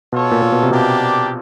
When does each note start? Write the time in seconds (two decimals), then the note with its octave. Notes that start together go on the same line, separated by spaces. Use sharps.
0.12 B2 F4 A4 C#5
0.31 A#2
0.42 A#2
0.52 B2
0.63 C3
0.71 B2 A#3 D4 G4